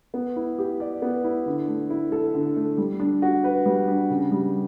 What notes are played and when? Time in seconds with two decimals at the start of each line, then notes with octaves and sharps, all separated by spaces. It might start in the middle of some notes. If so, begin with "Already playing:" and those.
0.14 B3
0.36 E4
0.58 G4
0.80 D5
1.02 B3
1.24 E4
1.46 D3
1.68 A3
1.90 E4
2.12 A4
2.34 D3
2.56 A3
2.78 G3
3.00 D4
3.22 F#4
3.44 B4
3.66 G3
3.88 D4
4.10 C#3
4.32 G3